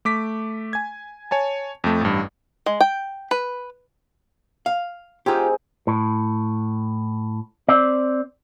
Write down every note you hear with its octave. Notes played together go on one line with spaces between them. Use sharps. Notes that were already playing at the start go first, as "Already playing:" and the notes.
A3 D6 B6
G#5 G#6
C#5 G#5 A5
F2 A3
A1 G2
G#3
G5
B4
F5
C4 D#4 F4 G4 G#4
A2
C4 D5